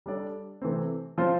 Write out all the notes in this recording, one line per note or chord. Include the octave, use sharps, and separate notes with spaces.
G3 D4 A4 D5
C3 E3 A3 C4
F3 C4 F4 C5